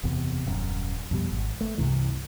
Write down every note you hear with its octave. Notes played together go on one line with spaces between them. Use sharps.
F#1 E2 C3
D#1 F#2
F2 B2 G3
G#1
A3
C2 G2 C3 E3